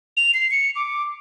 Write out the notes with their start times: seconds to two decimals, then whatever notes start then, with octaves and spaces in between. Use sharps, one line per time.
0.17 F7
0.34 C7
0.51 C#7
0.76 D6